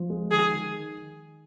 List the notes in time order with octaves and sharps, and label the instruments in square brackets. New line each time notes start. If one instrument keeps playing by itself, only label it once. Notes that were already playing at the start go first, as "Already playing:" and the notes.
Already playing: [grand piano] F3
G#3
[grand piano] D#3 [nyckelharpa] G#4
[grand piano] D#3